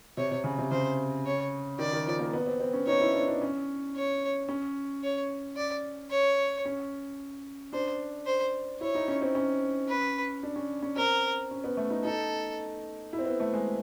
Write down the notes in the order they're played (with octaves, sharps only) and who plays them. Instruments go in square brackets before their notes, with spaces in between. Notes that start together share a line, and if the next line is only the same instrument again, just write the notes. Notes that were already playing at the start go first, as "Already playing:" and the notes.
[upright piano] C3 [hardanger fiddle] C#5
[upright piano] C3
C#3
C3
[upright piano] C#3 [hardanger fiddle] C5
[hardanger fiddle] C#5
[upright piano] D#3 [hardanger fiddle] D5
[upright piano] D#3
F3
A#3
B3
C4
C4
C#4
[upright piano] D#4 [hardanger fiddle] C#5
[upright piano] E4
D4
D4
C#4
[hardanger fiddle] C#5
[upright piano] C#4
[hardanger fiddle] C#5
D5
C#5
[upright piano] C#4
[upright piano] D4 [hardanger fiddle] C5
[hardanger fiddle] C5
[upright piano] E4 [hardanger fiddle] C#5
[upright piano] D#4
C#4
C4
C#4
[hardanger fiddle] B4
[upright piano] D4
C#4
C#4
[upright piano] C4 [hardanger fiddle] A#4
[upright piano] C#4
B3
A3
D#4
[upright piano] D#4 [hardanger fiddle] A4
[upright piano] E4
C4
B3
A3
G#3